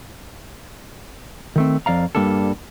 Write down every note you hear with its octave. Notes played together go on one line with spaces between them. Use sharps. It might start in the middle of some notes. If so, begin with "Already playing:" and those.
D#3 A3 C4
F2 D5 F5 A#5
G2 B2 G3 A#3 D4 A4